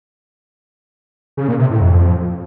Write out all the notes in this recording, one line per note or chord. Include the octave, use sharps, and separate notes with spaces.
C#3
A#2
C3
A2
F2